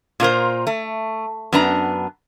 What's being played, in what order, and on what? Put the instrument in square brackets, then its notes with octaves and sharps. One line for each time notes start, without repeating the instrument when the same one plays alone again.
[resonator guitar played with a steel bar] A#2 F4 A#4 C5
A3
F#2 B3 D4 B4 A#5